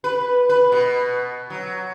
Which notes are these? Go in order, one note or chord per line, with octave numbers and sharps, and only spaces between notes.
B4
B4
B2
F#3